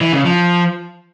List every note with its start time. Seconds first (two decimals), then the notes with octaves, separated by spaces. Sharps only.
0.01 E3
0.13 C#3
0.25 F3